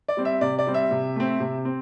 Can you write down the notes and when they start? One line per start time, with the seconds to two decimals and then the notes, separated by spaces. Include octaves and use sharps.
0.08 D5
0.17 G3 C4
0.25 E5
0.41 C3 D5
0.59 D5
0.67 G3 C4
0.74 E5
0.91 C3
1.16 A3 C4
1.40 C3
1.65 C4